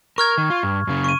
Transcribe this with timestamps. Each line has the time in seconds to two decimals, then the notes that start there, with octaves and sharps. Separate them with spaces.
0.18 A#4 C#6 F6 G#6
0.38 D#3
0.50 F4
0.63 G2
0.87 F#2 C#3
1.04 C#6 D#7